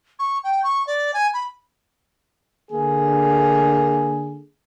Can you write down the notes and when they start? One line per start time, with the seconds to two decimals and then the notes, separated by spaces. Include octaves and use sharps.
0.19 C#6
0.44 G5
0.64 C#6
0.87 D5
1.14 G#5
1.34 B5
2.71 D3 A#3 G#4